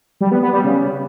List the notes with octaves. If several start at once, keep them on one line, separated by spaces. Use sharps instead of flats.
G3
B3
B3
G3
C#3